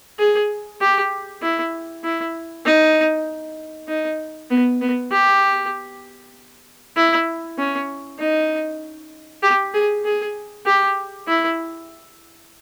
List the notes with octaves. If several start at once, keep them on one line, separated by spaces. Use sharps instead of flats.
G#4
G4
E4
E4
D#4
D#4
B3
B3
G4
E4
C#4
D#4
G4
G#4
G#4
G4
E4